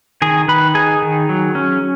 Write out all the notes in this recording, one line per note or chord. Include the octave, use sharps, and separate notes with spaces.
D#3 G#4 G#5
D#3 B4 B5
D#4 G#4 G#5
D#3
F#3
C#4